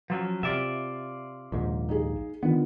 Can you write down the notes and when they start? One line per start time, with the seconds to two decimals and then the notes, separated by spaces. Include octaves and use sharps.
0.10 F3 F#3 C#4
0.43 C3 F4 D5 E5
1.52 A#1 D#2 G#2
1.89 D#4 G#4
2.43 D3 D#3 B3 F4